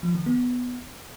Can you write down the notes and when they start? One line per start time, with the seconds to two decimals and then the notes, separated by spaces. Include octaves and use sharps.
0.03 F3
0.15 D#3
0.26 B3